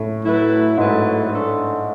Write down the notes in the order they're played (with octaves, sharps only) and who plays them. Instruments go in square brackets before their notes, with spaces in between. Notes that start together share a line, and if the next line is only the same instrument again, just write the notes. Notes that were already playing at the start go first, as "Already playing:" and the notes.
Already playing: [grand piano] A2
[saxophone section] F#3 A3 E4 B4
[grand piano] G#2 [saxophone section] F#3 A3 E4 B4
[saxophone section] A3 D4 A4